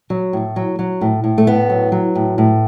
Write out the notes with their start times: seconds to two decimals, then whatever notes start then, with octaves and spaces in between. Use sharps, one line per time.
0.10 F#3
0.33 A2
0.56 F#3
0.79 F#3
1.01 A2
1.24 A2
1.38 A3
1.47 A2 B3
1.70 F#3
1.92 F#3
2.15 A2
2.38 A2